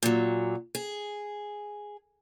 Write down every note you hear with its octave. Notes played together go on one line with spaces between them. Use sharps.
A#2 F#3
G#4